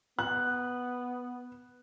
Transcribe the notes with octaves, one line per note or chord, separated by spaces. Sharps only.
B3 F#6